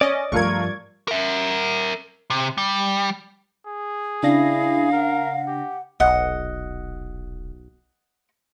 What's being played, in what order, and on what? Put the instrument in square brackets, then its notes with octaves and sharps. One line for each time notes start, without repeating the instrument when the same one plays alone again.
[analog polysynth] C#4 D#5 [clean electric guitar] D5
[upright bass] G2 F3 [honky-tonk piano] A3 F4 A#4 [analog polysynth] C#6 G#6
[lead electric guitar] A#4 E5
C3
G3
[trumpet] G#4
[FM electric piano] C#3 D4 A#6 [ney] E4 [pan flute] F5
[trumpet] A#4 [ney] F#5
[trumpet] G4
[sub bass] D#1 [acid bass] B1 [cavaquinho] D#5 F#5